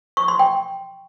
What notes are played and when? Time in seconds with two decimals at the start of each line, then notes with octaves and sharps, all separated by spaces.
0.17 C#6
0.28 C6
0.39 G5